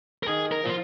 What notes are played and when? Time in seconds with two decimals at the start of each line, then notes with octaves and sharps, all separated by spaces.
0.23 A#4
0.28 D#3 G#4
0.51 A#4
0.63 F3 F4